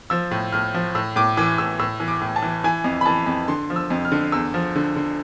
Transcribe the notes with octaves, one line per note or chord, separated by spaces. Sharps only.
F3 E6
A2
A2 F6
F3
A2 E6
A2 D6
E3 D6
A2 E6
A2 E6
E3
D6
A2
A5
E3
E3 G#5
F2
B5
E3 A5
F2
D3 C6
F3
E6
F2
F6
D3
E2 E6
F3
D3
D3